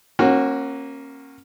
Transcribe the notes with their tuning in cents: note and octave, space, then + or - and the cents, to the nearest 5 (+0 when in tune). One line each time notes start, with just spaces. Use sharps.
A#3 +0 C#4 -30 F#4 +0